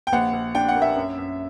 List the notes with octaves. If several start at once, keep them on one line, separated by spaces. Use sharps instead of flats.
G5
A#1 F#5
A#1
D4 G5
F#5
A#3
E5
F#2
F#2